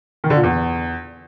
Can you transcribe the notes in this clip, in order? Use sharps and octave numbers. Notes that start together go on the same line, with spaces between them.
D#3
D3
A#2
E2